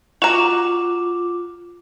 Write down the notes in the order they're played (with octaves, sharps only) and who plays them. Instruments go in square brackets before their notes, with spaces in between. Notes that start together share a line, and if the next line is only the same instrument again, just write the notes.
[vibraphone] F4 D6 [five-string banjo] F#4 A#5 [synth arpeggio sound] E7